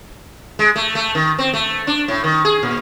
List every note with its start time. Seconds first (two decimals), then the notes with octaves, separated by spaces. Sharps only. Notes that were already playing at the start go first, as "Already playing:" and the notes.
0.59 G#3
0.76 A3
0.95 A3
1.15 D#3
1.39 C4
1.54 A3
1.87 D4
2.08 A2
2.24 D#3
2.45 G#4
2.63 A#2